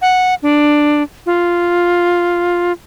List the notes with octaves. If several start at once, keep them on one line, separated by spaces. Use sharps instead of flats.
F#5
D4
F4